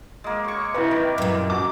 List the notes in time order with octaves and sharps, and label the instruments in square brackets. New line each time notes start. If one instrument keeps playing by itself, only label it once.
[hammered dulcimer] G#3 A#3
C#5 C#6
[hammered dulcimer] C3 A#3 [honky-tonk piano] E4 B4
[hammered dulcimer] D#3
[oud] F#2 A#2
[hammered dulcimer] F#3 [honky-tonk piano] D6